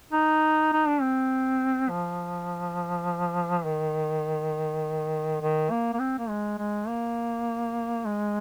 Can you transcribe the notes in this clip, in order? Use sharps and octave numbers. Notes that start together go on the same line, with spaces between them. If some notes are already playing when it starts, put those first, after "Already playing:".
D#4
D#4
D4
C4
F3
D#3
D#3
A#3
A#3
C4
A#3
G#3
G#3
A#3
G#3